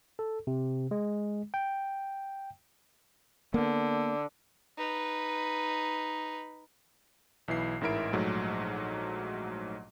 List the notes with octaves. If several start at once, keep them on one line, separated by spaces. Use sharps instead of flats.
A4
C3
G#3
G5
D3 A#3 B3
D#4 B4
B1 E3 E4 C7
A1 G#2 E4 A#4 E5 D7
A#1 G#2 F#3 A3